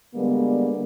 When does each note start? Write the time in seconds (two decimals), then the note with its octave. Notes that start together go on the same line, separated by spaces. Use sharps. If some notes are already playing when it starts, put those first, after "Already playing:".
0.15 D3 G3 G#3 A#3 B3